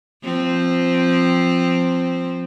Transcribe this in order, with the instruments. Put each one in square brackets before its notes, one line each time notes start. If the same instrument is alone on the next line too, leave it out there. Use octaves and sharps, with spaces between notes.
[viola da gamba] F3 C4